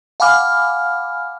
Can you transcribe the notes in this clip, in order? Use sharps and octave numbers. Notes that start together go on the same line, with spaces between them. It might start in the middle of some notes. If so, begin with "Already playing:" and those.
F5 F#5 G#5 B5 D6 F6